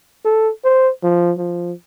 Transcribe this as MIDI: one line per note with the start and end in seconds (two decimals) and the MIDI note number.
0.25 0.50 69
0.65 0.90 72
1.03 1.33 53
1.38 1.72 53